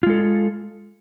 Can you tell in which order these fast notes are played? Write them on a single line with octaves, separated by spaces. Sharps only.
F4 G#3 A4